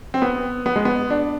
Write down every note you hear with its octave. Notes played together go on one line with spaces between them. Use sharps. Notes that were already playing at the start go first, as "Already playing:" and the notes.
C4
B3
B3
G#3
B3
D4